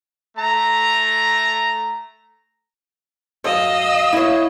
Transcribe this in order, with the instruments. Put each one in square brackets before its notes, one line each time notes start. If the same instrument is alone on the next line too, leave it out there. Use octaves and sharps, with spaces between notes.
[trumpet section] A3 A#5
[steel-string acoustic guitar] F#2 [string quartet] D#5 F5 E6
[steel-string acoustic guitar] E4 C#5